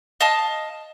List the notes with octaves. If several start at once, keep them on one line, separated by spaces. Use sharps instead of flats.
D#5 F5 A5